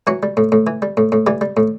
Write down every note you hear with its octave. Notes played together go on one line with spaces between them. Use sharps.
E3 F#3 F#4
G3
A2
A2
E3
G3
A2
A2
E3 G3 G4
G3
A2